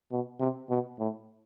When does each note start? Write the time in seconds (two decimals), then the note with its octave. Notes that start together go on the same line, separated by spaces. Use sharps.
0.12 B2
0.40 C3
0.70 B2
0.99 A2